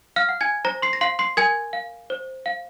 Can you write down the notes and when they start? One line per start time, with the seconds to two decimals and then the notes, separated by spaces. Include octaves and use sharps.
0.16 F5 F6
0.29 F#5
0.41 G#5 G#6
0.65 C5 A#5 A#6
0.82 C6 C7
0.93 A#6
1.01 F5 C6 C7
1.19 C6 C7
1.37 A#4 G#5 G#6
1.73 F5
2.10 C5
2.46 F5